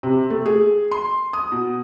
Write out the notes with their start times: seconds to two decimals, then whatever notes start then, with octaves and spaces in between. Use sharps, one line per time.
0.03 C3
0.30 A3
0.46 G#4
0.91 C6
1.33 D#6
1.52 B2